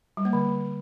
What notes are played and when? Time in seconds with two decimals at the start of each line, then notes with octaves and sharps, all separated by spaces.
0.17 G3
0.25 A#3
0.33 D3